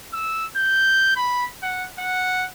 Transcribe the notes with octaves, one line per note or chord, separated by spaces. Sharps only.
E6
G6
B5
F#5
F#5